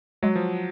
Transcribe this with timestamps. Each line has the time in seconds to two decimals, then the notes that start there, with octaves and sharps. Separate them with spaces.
0.23 F#3 G#3
0.35 F3